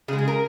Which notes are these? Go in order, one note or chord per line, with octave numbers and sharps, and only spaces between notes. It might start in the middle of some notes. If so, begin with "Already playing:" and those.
C#3 G#3 G#4
G#4
A#4